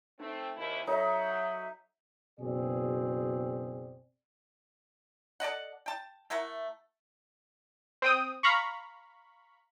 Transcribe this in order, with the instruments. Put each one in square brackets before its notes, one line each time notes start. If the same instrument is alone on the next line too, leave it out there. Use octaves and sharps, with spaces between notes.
[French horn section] A3 C4 [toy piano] D#4
[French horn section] D#2 C3 E4
[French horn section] F#3 [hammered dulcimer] D#4 [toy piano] A4 C#5 A5 [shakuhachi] E5
[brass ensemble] F#1 B2 C4 G#4 D5
[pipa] A4 D5 D#5 F#5
G5 A5
A3 E4 A#4 F#5
[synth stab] C4 G5 D#6
F5 A#5 B5 C#6